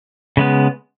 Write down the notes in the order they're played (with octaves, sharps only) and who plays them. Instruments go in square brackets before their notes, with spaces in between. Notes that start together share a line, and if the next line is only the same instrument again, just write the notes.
[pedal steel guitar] C#3 G#3 B3